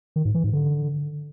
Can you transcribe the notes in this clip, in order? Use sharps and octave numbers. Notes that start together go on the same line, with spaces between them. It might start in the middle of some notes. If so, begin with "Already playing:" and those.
D#3
G#2
E3
G#2
D3